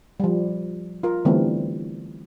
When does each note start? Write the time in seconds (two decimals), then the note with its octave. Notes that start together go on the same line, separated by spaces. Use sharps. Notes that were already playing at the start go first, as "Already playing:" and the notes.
0.20 F3 G3
1.03 F4 A#4
1.25 D3 E3 G3 A3 B3 C4